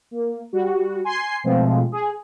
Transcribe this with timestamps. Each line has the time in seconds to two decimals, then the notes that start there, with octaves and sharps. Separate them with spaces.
0.11 A#3
0.53 G3 F#4
1.04 G#5 C6 C7
1.44 B2 F3 G#3 A3 C4
1.92 G#4